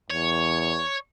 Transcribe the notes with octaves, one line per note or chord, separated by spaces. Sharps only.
E2 C#5